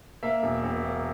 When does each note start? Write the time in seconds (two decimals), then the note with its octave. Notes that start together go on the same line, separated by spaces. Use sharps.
0.23 A#3 E5
0.43 E1
0.63 E1
0.84 A#3